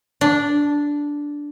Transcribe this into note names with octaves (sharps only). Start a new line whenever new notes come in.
D4